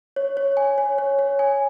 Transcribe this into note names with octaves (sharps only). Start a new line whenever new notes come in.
C#5
C#5
G#5
C#5
C#5
C#5
G#5